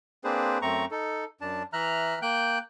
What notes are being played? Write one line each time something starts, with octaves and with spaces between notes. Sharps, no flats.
A#3 C4 D4 G#4 B4 C5
F#2 A3 C4 A#5 C#6
D#4 A4
F#2 D4 A5
E3 E5 A#5 F6 F#6
A#3 G5 F#6 G6